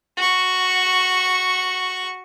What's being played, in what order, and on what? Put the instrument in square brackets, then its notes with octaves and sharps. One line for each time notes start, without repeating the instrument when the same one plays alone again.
[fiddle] F#4 C#6